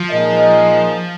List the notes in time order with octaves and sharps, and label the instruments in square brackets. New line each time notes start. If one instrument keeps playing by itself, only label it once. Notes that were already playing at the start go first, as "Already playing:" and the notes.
Already playing: [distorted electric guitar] F3
[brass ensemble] A#2 G#3 D#4 A#4 D#5